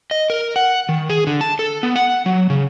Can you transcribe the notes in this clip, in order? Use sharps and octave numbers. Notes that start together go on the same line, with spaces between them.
D#5
A#4
F#5
D#3
G#4
D3
A5
A4
B3
F#5
F#3
C#3